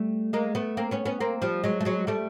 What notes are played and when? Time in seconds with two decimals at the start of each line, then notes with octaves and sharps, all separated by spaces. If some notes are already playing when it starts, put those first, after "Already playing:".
Already playing: G3 A3
0.33 G#3 A#3
0.55 A3 B3
0.77 A#3 C4
0.91 B3 C#4
1.05 B3 C#4
1.21 A#3 C4
1.42 F3 G3
1.64 F#3 G#3
1.80 A3
1.85 F#3 G#3
2.07 G3 A3